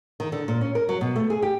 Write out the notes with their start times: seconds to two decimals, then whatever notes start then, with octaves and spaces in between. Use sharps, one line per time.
0.20 D#3
0.32 D3
0.48 A#2
0.61 C#4
0.75 A#4
0.89 F#3
1.01 B2
1.16 A3
1.30 G#4
1.42 G4